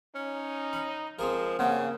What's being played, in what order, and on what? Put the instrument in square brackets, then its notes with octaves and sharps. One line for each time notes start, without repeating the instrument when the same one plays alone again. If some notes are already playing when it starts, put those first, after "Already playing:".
[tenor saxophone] C#4 [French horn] D#4
[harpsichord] B5
[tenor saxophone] F3 [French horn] G#3 [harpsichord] C4 G#4 A#4
[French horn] G2 [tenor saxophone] C#3 [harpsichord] A#3 C4 [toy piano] F#5